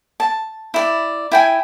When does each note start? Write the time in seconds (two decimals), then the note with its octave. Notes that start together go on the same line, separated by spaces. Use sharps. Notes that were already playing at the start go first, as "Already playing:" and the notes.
0.20 A5
0.74 E4 D5
1.32 E4 G5 G#5